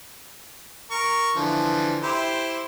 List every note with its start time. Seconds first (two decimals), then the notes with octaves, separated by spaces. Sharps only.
0.91 A#4 C#6
1.36 D3 E3 F3
2.03 E4 G4 C5